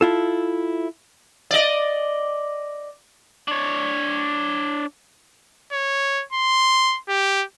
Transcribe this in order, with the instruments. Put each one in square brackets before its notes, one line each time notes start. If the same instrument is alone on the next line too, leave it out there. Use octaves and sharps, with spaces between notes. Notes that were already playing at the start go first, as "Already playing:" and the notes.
[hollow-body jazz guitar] E4 F4 A4
[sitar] D5 D#5
[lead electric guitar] D4 C#5
[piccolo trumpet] C#5
C6
G4